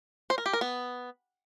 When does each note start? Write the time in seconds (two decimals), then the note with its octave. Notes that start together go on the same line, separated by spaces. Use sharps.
0.30 C5
0.38 A#4
0.46 G4
0.53 A#4
0.61 B3